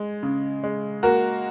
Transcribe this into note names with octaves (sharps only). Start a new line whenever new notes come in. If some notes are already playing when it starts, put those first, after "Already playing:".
Already playing: G#3
C#3
G#3
A#3 F#4 A#4